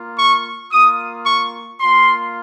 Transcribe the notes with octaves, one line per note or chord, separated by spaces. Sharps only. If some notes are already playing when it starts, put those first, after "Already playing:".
Already playing: A#3 F4
C#6
A#3 F4 D#6
C#6
A#3 F4 C6